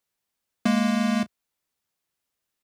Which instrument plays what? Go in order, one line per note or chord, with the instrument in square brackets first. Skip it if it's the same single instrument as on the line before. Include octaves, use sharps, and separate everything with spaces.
[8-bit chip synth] G#3 A#3